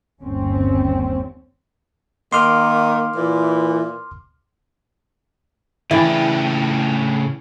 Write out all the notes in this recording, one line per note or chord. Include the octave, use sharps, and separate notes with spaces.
G1 D#2 C4 C#4
D#3 A#3 C6 D6 F6
A#2 E3
A2 C#3 E3 D4 E4 D5 G5 G#5